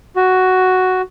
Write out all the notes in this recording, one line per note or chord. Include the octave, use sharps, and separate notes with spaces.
F#4